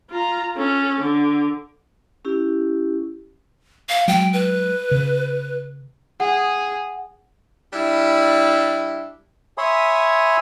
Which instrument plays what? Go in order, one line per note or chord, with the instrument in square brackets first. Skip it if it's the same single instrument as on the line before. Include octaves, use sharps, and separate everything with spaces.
[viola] F4 A#5
C#4 A4
D3
[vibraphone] C#4 E4 G4
[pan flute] F5
[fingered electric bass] F#3 G#3 [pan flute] G5
[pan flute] B4
[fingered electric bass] C#3
[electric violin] G#4 [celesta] F#5
[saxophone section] G3 D4 E4
[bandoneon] C#5 E5 G#5 B5 C6 D#6